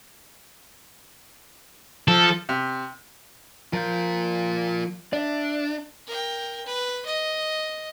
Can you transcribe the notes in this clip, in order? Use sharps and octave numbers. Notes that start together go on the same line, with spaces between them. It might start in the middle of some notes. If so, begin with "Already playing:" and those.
F3 A4
C3
F3 F4 A#4 G6
D4 D5 E5
A#4 G5
B4
D#5